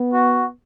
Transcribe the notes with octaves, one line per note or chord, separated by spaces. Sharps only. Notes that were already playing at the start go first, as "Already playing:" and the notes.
Already playing: B3
F#4